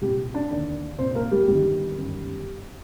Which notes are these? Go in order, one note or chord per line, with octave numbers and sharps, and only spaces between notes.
C2 A#2 G3 G4
D4 D5
D#2 D3 D4 D5
C2 A#2 C4 C5
A#3 A#4
G3 G4
G1 G2 D#3 G3 G4
G1 F#2 D#3